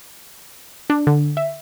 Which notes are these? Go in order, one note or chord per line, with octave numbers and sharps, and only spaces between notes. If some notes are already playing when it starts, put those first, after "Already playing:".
D4
D3
E5